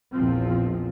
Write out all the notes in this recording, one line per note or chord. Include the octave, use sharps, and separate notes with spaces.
A#1 E2 F3 C4